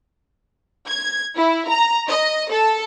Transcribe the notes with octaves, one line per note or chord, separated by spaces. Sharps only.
G#6
E4
A#5
D#5
A4